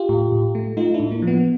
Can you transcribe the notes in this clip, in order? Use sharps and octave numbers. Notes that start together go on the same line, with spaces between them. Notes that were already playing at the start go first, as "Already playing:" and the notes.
Already playing: F4 G4
A2
A2
A3
A3 D#4 F4
D4 E4
A2
A#3
F3
B3